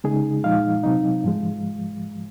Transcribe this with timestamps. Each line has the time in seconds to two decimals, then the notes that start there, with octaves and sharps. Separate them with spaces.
0.04 C#3 G#3 D#4 G#4
0.44 A#2 F3 G#3 D#4 F5
0.83 C3 F#3 C4 D#4
1.24 G#2 F3 G#3